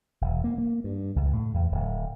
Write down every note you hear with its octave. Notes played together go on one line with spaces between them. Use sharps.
E1
A#3
A#3
G2
C#2
A2
E2
D1